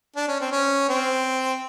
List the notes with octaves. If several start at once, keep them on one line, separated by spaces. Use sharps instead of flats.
D4
C#4
C4
C#4
C4